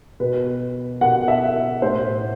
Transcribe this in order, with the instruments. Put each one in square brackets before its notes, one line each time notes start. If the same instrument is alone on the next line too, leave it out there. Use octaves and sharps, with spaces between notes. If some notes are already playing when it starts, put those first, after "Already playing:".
[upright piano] B2 B4
B2 F#5
E5
A2 C5